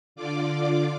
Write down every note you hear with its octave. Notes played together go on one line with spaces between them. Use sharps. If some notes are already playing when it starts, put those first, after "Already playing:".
D3 F4 D5 D6